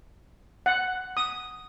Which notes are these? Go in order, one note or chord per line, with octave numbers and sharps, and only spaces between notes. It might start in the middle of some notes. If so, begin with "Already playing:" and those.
F#5
D#6